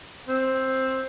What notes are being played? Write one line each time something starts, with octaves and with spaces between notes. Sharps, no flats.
C4